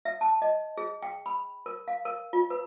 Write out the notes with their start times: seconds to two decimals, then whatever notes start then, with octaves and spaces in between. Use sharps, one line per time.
0.05 E5
0.21 A5
0.42 D#5
0.77 G#4
1.03 G5
1.26 B5
1.66 A#4
1.88 F5
2.05 A#4
2.33 F4
2.50 B4